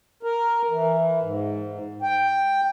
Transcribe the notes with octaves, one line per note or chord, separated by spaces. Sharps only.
A#4
E3
G#2
G5